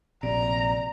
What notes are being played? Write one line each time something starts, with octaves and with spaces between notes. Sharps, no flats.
A#1 C3 D5 A#5